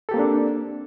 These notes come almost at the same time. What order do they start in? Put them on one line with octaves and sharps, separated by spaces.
A4 G4 A#3 C4 D4